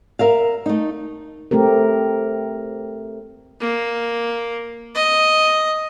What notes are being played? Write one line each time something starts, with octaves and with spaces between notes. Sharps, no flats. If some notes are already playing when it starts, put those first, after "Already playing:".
A#4 E5 F5
A3 D#4
A3 C4 G4 A#4
A#3
D#5